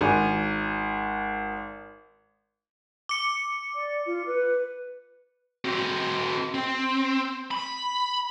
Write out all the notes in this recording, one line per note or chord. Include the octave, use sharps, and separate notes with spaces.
G#1 G#5
D6 C#7
D5
F4
B4
C4 F#4
C4
B5